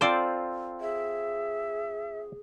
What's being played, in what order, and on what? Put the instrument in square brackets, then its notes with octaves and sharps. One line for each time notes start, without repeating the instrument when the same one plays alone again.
[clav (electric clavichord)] C4 F4 A4 [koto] C5 D5
[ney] G#4 [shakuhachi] E5